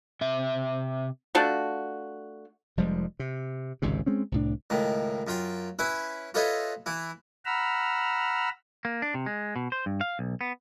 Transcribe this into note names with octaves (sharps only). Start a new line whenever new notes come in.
C3 E5
A3 D4 F4 F#4
F1 F3 G3 G#3
C3
G#1 C#2 G#2 C3
G#3 C4 C#4
C2 A2 D4
C#2 A2 D#3
F#2 F4 G5
C#4 E4 B4 E5
F4 A4 B4 C#5 D#5 E5
E3 E4
F#5 A#5 B5 E6 F6
A#3
D4
C3
G#3
B2
C5
G2
F5
B1
B3